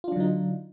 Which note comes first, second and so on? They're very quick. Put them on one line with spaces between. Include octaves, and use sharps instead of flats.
F4 D4 F#3 D3 D#4